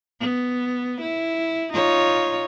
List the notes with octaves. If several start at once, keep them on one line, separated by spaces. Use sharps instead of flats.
B3
E4
D#4 F4 C#5